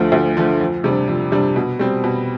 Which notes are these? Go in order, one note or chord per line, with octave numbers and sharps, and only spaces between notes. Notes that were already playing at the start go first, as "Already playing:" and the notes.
Already playing: D2 D3 F3 A3
D2
D3 F3 A3
F2
C3 G3 D4
F2
C3 G3 D4
B2
G3 C4
B2